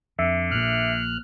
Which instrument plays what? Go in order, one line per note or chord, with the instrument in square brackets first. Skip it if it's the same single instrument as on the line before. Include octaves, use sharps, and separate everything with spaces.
[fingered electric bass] F2 [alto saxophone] D3 [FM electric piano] E5
[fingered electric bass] A#1 A#2 [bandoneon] F6 F#6